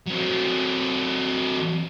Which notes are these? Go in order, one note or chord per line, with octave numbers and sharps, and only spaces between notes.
F#3 C4